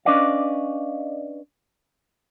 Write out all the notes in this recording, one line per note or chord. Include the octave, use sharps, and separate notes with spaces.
C#4 D4 B4 D5 D#5 F5